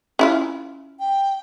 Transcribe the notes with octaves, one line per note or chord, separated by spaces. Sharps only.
C#4 E4 F4
G5